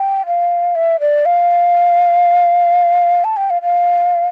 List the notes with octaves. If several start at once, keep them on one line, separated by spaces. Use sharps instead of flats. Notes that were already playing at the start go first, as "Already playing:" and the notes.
Already playing: G5
F5
E5
D5
F5
A5
G5
F5
F5